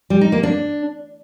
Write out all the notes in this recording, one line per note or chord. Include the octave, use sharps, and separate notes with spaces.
G3
D#4
A#3
D4